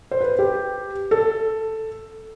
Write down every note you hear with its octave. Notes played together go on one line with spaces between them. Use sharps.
C5
B4
G4
A4